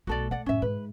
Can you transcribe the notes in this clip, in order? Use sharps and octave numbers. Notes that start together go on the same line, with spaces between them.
B1 A3 F#4 A4 D5
A3 D5 F#5
F#2 A2 C#4 E5
G#2 B4